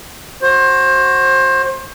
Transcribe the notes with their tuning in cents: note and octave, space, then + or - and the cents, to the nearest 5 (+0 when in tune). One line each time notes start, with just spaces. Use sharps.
F#4 +0 C5 +25